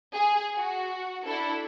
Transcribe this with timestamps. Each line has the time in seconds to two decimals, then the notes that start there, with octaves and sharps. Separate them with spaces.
0.13 G#4
0.58 F#4
1.25 D4 E4 A4